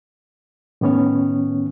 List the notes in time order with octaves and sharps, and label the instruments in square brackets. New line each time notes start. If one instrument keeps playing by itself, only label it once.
[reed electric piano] A2 D#3 B3 C#4 C#5